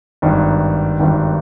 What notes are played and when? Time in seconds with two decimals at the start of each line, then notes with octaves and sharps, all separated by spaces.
0.22 G#1 G2 D#3
1.00 G#1 G2 D#3